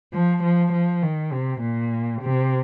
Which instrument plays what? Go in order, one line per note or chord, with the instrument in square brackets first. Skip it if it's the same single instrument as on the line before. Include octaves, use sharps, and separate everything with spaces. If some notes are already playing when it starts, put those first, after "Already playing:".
[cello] F3
F3
F3
D#3
C3
A#2
C3